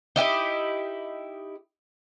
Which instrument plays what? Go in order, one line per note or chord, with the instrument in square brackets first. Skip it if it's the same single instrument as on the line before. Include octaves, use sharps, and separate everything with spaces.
[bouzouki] D#4 E4 G4 D#5